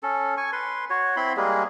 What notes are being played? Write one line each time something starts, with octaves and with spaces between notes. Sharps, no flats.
C#4 A4
G#5 C#6
B4 C6
F#4 C#5
C4 E4 B5 C6
G3 G#3 A#3 G#4